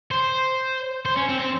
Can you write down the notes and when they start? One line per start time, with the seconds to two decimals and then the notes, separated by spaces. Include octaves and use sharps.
0.11 C5
1.05 C5
1.16 C#4
1.29 C4
1.40 C4